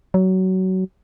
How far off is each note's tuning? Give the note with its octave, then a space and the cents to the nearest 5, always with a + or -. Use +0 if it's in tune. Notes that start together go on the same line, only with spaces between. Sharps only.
F#3 +20